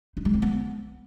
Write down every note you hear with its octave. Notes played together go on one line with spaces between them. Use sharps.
D#4
G#3
C4
B3